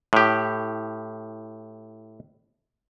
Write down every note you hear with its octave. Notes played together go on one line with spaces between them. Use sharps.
A2 G4